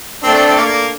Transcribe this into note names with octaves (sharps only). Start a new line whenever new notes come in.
A3 C4 D4 A4 D5
C4
C4
A#3
A#3